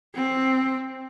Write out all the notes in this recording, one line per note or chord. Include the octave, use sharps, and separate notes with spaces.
C4